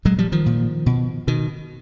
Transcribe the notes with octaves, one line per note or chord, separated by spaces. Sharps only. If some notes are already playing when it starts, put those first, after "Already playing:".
A#2 F#3 G#3
F3 G3
D#3 F3
A#2
B2
B2 D#3